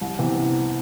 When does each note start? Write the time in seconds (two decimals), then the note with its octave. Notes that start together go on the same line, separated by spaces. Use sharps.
0.01 C2
0.18 C3 E3 B3